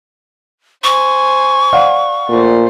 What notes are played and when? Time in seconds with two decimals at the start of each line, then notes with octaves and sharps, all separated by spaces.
0.84 C5 G#5 C#6
1.73 D5 F5 F#5
2.29 A#2 A3 C5